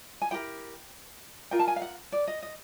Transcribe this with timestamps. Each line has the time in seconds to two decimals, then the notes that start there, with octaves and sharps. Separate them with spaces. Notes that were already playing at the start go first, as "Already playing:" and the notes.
0.22 G#5
0.31 E4 G4 A#4 G5
1.51 F4 A#4 G5
1.59 A5
1.68 G#5
1.76 F5
1.82 F#5
2.12 D5
2.27 D#5
2.42 D#5